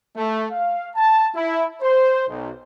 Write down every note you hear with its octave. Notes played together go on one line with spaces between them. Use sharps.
A3
F5
A5
E4
C5
B1